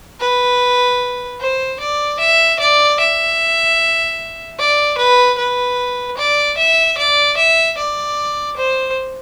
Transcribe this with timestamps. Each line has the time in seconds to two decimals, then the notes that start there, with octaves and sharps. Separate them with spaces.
0.21 B4
1.40 C5
1.80 D5
2.20 E5
2.60 D5
3.00 E5
4.59 D5
4.98 B4
5.38 B4
6.18 D5
6.57 E5
6.98 D5
7.37 E5
7.78 D5
8.57 C5